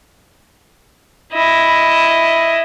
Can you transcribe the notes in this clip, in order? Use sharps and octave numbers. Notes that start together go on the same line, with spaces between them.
E4 D#5